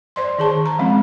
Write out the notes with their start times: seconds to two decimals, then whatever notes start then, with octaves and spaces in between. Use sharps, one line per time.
0.16 C5 D5 C6
0.38 D#3 G#4 A5
0.66 A#5
0.79 F3 G#3 C4 C#4